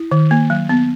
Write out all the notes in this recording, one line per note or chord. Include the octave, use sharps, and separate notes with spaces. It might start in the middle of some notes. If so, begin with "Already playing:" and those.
Already playing: E4
D#3
A#3
F#3
B3